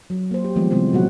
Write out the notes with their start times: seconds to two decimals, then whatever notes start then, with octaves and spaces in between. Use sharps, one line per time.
0.10 F#3
0.31 A#3 C5
0.44 G4
0.56 D#3 F3 G3 G#3 B3
0.70 C3 E3 G3 G#3 C4 C5
0.93 A#2 C#3 F#3 A#3 F#4 F#5